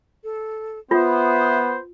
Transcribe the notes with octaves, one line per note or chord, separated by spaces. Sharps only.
A4
B3 F4 C5 E5 D#6